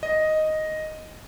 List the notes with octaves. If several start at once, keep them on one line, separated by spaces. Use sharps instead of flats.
D#5